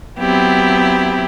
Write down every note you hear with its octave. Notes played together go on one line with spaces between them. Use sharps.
F#3 B3 C4 E4 G4